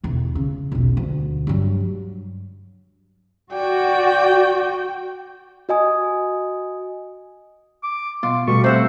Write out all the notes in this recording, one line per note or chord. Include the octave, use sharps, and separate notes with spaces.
E1 D#2
C#3
E1 B1
D2
G2 F#3
F#4 D5 G5
F#4 D#5 G#5 D#6
D6
B2 F4 D6
B2 G3 A3 C#6
C3 C5 E5 F#5